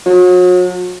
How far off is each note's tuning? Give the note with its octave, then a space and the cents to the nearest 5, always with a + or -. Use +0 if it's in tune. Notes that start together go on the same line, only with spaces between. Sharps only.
F#3 -40